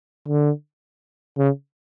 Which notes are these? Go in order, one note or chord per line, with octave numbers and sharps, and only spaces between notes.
D3
C#3